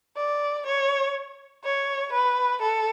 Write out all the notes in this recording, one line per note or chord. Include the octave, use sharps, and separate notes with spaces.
D5
C#5
C#5
B4
A4